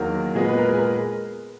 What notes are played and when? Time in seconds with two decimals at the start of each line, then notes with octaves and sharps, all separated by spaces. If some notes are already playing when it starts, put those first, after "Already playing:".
Already playing: E2 D#3 F#3 A#3 A#4
0.34 A#2 G#3 B3 G#4
0.49 B4
0.58 A#4
0.68 G#4
0.79 A#4